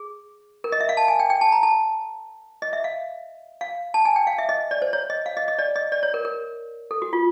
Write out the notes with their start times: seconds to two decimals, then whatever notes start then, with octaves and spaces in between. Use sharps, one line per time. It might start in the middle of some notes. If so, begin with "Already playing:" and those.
Already playing: G#4
0.64 A#4
0.72 D#5
0.80 E5
0.89 F5
0.97 A5
1.08 G#5
1.19 G5
1.30 G5
1.41 A5
1.52 A#5
1.63 A5
2.62 D#5
2.73 E5
2.84 F5
3.61 F5
3.94 A5
4.05 G#5
4.16 G5
4.27 F5
4.38 E5
4.49 D#5
4.71 D5
4.82 C5
4.93 C#5
5.10 D#5
5.26 F5
5.37 D#5
5.48 D#5
5.59 D5
5.76 D#5
5.92 D5
6.03 C#5
6.14 A#4
6.25 A#4
6.91 A4
7.02 F#4
7.13 F4